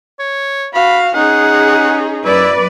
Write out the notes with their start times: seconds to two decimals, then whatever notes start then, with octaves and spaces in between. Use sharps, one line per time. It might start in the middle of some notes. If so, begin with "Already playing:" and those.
0.19 C#5
0.74 F#4 F5 B5
1.14 C#4 D#4 G#4 F#5
2.25 F#2 E4 B4 D5